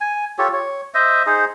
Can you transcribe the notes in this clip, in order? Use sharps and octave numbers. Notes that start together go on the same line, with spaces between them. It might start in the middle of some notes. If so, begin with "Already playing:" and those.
G#5
F4 G4 A4 C#5
C#5
C5 D#5 E5
D#4 G#4 C5